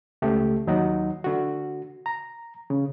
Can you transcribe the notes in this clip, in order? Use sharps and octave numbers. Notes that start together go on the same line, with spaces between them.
C#2 A3 G4
D#2 F#3 D#4 F#5
D3 F#4
A#5
C#3